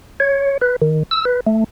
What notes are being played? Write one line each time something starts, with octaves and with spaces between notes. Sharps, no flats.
C#5
B4
D#3
E6
B4
A3